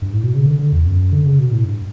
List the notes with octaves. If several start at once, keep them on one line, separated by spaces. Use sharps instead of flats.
G2
A2
B2
C#3
D3
D3
E2
F#2
D3
C#3
B2
A2
G2